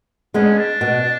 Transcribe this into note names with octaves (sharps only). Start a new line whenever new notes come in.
G#3 B3 C#4 D4
D4
B2